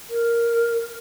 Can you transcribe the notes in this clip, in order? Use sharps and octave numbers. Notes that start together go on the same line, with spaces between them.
A#4